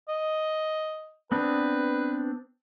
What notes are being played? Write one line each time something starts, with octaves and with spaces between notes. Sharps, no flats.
D#5
B3 C4 D4 B4